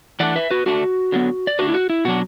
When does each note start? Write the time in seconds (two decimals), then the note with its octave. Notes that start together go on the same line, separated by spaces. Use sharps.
0.20 E3 A3 D4 D5 F#5
0.36 B4 E5
0.51 F#4 B4
0.66 D3 A3 D4 F#4
1.12 D3 F#3 B3
1.47 D5
1.59 D3 A3 D4 F#4 B4
1.69 E4
1.74 F#4
1.90 E4
2.05 B2 F#3 D4 F#4